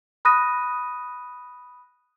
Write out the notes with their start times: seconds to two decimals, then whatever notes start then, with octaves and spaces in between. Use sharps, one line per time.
0.25 B5 D#6 F#6 A#6 D#7